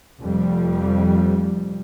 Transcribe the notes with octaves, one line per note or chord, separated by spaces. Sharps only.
F1 F2 G3